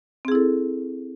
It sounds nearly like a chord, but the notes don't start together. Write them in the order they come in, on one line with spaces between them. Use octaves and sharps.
C4 G#4 E4 A4